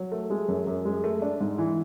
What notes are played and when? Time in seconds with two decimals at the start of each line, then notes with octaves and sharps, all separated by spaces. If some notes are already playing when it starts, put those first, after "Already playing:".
Already playing: F#3
0.12 A3
0.30 G#3
0.48 F#2
0.67 F#2
0.85 G#3
1.04 A3
1.22 D4
1.40 G#2
1.58 E3